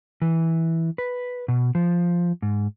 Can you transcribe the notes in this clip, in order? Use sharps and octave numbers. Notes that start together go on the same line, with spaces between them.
E3
B4
B2
F3
G#2